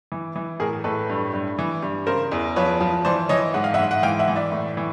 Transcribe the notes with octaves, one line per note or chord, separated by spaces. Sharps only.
E3
E3
A2 G#4 A#4
A2 A4 B4
G2
G2
E3
G2
C#3 A#4 C5
E2
F3 B4 C#5
F3
E3 C5 D5
E3 C#5 D#5
G#2 F#5
F5
E5 F#5
G#2
F#5
E3 F5 G5
E5 F#5
E3
D5 E5
A2
E3